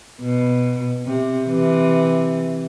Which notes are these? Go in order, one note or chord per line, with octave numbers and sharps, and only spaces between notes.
B2
C3
C3 E3